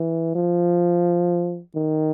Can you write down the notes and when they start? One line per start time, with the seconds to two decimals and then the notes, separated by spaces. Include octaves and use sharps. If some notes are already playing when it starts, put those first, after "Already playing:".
Already playing: E3
0.35 F3
1.76 D#3